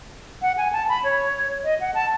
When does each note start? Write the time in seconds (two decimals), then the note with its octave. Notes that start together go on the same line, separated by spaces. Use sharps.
0.42 F#5
0.57 G#5
0.73 A5
0.89 B5
1.04 C#5
1.64 D#5
1.80 F#5
1.94 A5